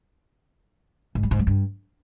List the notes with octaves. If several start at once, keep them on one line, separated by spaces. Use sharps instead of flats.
G#2
G3
G#2
G3
G2